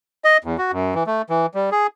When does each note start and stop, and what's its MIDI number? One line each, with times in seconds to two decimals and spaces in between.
0.24 0.37 75
0.44 0.57 40
0.58 0.71 66
0.72 0.94 42
0.95 1.04 52
1.07 1.22 57
1.30 1.46 52
1.54 1.70 55
1.72 1.87 68